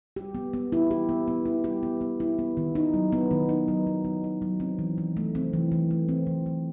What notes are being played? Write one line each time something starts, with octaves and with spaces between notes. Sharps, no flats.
G4
B3
B3
E4
G4
B3
B3
E4
G4
B3
B3
E4
B3
D#3
D#4
F#3
B3
D#3
D#4
F#3
B3
D#3
D#4
F#3
C4
E3
E3
A3
C4
E3
E3
A3
C4
E3
E3